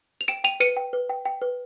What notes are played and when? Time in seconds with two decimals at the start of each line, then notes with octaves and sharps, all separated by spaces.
0.21 F7
0.28 G5 D7 E7
0.44 G5 D#7 F7
0.60 B4 C#7 D#7
0.77 G5
0.93 B4
1.09 G5
1.25 G5
1.42 B4